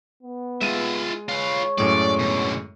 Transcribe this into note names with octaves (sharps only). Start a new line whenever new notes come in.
B3
G#3 F4 E5 D#7
F4 B4 C#5
F#2 A2 G#3 D5
B2 D3